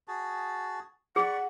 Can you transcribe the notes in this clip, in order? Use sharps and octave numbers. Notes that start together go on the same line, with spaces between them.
F#4 G#4 A5
G#4 D5 F#5 B5 C#6